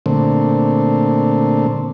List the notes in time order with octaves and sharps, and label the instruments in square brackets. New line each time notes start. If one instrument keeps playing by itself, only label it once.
[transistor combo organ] A#2 D3 A3 C4